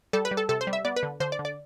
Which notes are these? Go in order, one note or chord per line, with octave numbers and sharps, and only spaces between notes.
G3 A4
B4
G3
A4
C3 A4
C5
G3
E5
B3 D5
B4
D3
D3 C5
D5
D3
D5